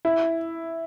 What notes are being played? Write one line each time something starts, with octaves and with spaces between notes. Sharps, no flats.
E4